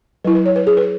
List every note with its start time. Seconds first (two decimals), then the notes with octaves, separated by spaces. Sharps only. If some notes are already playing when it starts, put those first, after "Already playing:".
0.25 F#3 E4 B4
0.35 B4
0.46 C#5
0.56 B4
0.67 G#4
0.77 B4